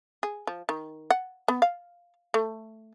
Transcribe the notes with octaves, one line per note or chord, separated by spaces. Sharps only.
G#4
F3
D#3
F#5
B3
F5
A3